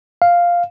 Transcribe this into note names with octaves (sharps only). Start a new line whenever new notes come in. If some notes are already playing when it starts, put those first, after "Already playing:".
F5